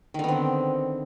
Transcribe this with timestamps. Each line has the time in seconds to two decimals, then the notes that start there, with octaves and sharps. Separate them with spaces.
0.14 D#3
0.19 D3
0.24 B3
0.28 C4